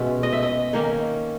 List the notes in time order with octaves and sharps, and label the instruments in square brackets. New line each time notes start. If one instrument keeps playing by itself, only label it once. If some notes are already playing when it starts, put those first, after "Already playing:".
Already playing: [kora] B2 G#3 C#4 E5
D#5
E5
D#5
D#3 A#3 C#4